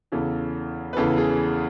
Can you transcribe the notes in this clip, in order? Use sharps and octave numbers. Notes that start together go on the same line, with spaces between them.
E2 C#3 E3 A4
B4
E2 C#3 E3 A4
G#4